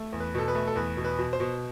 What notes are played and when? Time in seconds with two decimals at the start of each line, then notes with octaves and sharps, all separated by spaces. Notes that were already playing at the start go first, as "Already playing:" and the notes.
Already playing: A3
0.13 E2
0.20 B4
0.34 B2 A4
0.48 B4
0.55 A3
0.68 A4
0.76 E2 B4
0.97 B2
1.04 B4
1.18 B2
1.33 C5
1.40 B2